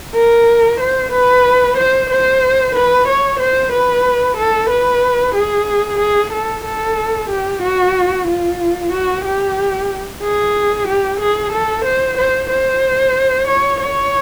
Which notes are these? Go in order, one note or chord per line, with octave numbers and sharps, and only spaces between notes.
A#4
C5
B4
C5
C5
B4
C#5
C5
B4
A4
B4
G#4
G#4
A4
A4
G4
F#4
F4
F#4
G4
G#4
G4
G#4
A4
C5
C5
C5
C#5
C#5